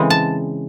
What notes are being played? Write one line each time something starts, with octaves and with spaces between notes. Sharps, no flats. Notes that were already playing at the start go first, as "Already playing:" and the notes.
Already playing: C#3 E3 G#3 C4
A5